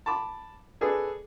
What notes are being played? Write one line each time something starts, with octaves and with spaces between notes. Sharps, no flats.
A5 B5 D6
D4 G#4 A4 B4 D5